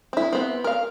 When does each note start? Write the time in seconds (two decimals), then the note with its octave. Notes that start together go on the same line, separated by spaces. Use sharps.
0.13 C4 E4
0.33 B3 C4
0.64 A#4 F5